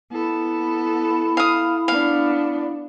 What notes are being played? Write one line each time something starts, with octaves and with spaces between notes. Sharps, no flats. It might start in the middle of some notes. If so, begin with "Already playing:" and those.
B3 E4 A4
F5 D#6
B3 D4 F5